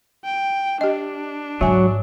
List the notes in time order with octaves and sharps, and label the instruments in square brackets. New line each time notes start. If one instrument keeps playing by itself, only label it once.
[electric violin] G5
[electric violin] D4 [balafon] G4 D#5
[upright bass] G#2 [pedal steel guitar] F#3 [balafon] E5 G#5